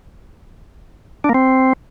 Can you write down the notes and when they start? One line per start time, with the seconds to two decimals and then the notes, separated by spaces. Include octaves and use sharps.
1.24 D4
1.29 A#3
1.34 C4